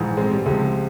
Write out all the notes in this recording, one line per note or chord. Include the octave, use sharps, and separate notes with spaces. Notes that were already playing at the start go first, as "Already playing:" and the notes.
Already playing: A#1 G#2 E3
G#3 C4
G3
C#2 C3 F3 G#3